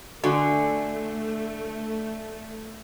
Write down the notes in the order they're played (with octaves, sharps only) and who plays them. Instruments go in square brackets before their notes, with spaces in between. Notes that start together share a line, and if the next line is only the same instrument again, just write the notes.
[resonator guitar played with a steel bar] D3 [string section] A3 [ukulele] F#4 G#5